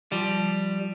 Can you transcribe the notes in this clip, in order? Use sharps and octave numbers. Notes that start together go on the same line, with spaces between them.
F3 G3